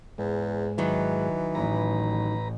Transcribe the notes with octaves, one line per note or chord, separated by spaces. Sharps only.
E2 G#2
D#3 E3 F#3
A1 B4 A#5